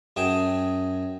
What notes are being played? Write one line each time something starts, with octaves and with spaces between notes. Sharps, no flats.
F#2 G#4 G5 A5